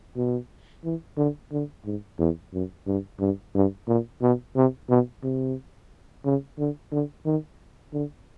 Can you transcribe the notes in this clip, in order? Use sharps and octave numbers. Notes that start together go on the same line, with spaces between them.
B2
E3
D3
D3
G#2
E2
F#2
G2
G2
G2
A#2
B2
C3
B2
C3
C#3
D3
D3
D#3
D3